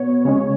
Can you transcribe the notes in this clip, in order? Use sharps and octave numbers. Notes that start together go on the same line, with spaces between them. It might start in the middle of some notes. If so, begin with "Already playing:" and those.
Already playing: B2 B3 C#5
C#3 G#3 C#4